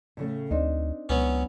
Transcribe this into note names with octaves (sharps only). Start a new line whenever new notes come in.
A2 C#3 A3
D2 C4 D4 D#4
C#2 F#3 B3 C#4